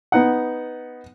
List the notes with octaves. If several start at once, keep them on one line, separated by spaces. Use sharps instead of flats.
B3 D#4 F#5